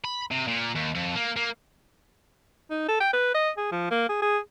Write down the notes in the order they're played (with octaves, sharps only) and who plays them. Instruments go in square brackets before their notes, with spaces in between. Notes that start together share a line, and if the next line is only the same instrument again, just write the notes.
[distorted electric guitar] B5
C3
A#2
D#2
F2
A#3
A#3
[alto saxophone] D#4
A4
G5
B4
D#5
G#4
F3
A#3
G#4
G#4